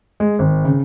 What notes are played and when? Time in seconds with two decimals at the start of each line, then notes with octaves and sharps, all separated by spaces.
0.20 G#3
0.39 G#1
0.65 C#3